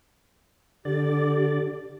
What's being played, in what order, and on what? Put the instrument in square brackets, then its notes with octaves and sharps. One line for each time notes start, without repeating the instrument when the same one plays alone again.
[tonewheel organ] D3 D5 [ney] G4